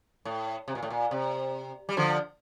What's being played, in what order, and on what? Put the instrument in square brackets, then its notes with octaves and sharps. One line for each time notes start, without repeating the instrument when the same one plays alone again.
[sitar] A2
C3
A#2
A2
A#2
C3
G3
D3 F3